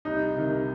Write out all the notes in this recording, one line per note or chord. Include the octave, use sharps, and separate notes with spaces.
C2 D#4
C3 D#3